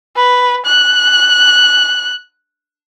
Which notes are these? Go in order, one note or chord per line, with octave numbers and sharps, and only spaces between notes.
B4
F#6